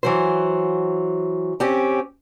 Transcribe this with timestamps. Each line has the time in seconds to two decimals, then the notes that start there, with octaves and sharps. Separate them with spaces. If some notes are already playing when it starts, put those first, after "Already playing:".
0.03 E3 F#3 C5
1.60 C4 C#4 G4